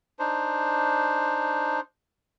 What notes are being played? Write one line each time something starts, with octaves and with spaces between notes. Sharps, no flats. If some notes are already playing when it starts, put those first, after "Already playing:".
D4 D#4 C5